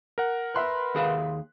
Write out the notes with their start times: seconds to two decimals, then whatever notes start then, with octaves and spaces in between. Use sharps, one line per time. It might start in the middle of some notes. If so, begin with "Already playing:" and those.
0.18 A#4 F#5
0.55 B4 E5 C6 F#6
0.95 D#2 G#4 F5